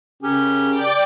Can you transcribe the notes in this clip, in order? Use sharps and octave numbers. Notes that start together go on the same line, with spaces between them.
C#3 C#4 G4 G#4 A#4
D5 G5 D6